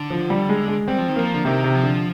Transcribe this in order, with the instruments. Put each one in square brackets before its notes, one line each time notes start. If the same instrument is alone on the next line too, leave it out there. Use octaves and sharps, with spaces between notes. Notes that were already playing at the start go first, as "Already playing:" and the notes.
Already playing: [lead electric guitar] D3
[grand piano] F3
G3
G#3
G#3
[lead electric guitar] G3 [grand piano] C4
[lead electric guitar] F3
D#3
[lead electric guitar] F3 [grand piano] A#3
[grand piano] D3
[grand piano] C3 [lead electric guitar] D#3
[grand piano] C3
[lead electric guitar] F3
[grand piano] D3